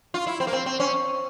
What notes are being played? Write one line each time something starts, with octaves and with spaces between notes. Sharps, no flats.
F4
E4
C4
A#3
C4
C4
C#4